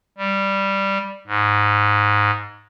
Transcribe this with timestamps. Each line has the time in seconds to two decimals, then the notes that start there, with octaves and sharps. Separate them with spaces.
0.18 G3
1.27 G#2